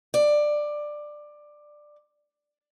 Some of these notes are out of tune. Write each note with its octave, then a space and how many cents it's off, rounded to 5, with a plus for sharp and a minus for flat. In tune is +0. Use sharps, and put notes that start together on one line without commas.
D5 +15